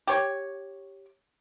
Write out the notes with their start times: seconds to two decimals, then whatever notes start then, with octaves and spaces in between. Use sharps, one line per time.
0.07 G4 C#5